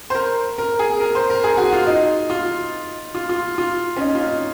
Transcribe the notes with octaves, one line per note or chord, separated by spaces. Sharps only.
C5
A#4
A#4
G#4
A#4
C5
A#4
G#4
F#4
F4
D#4
F4
F4
F4
F4
C#4
D#4
F4
D#4